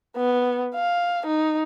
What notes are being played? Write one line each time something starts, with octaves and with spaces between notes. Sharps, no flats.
B3
F5
D#4